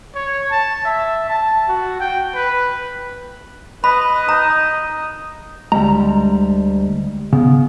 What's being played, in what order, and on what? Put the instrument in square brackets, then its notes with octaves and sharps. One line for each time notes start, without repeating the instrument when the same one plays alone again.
[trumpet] C#5
A5
E5
A5
F#4
G5
B4
[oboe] B4 [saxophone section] D#5 [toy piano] B5
[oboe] D#4 [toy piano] A#5
[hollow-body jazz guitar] D2 G3 A#5 [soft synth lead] G#3
[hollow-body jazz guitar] C#3 [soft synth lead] B3